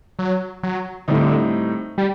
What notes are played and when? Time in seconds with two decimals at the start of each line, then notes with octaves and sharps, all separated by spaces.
0.19 F#3
0.63 F#3
1.08 A2 D3 G3 C4 D#4
1.98 G3